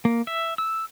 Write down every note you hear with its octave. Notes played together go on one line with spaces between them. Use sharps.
A#3
E5
E6